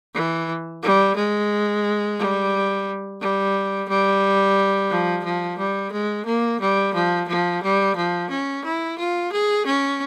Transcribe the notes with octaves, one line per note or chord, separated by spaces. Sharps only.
E3
G3
G#3
G3
G3
G3
F3
F3
G3
G#3
A#3
G3
F3
F3
G3
F3
C#4
E4
F4
G#4
C#4